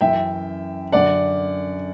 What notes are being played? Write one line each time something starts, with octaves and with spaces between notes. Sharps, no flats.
F#2 E3 E5 G5
F#2 D3 D5 F#5